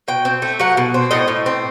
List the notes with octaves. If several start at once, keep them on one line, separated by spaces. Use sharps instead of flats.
B2 G5
C4
A3
F#3 F#5
B2
C4
A2 D#5
A2
C4